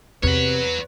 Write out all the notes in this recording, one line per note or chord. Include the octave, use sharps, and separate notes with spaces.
E2 C3 B4 C#5 F#5